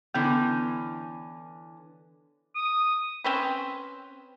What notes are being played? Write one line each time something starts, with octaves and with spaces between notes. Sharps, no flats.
D3 E3 B3 C#4
D#6
C4 C#4 B4